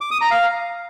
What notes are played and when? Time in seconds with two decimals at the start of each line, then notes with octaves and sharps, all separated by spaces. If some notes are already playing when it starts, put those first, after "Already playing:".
0.01 D6
0.11 D#6
0.21 A#5
0.31 F5